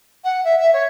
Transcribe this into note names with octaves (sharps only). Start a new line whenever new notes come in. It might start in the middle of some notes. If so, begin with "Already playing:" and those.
F#5
E5
E5
C#5